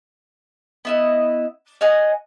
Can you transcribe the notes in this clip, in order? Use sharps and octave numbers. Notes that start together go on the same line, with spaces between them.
B3 E4 D#5
C#5 D#5 F#5 G#5